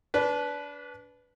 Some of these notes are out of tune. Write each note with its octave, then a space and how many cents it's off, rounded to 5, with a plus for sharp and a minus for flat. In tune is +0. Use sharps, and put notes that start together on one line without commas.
D4 -25 B4 +0